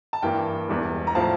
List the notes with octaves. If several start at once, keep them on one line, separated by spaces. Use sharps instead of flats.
A5
G2 E3 A#3 G5
E1 E2 E3 G3
A#5
A2 F3 C4 F5 A5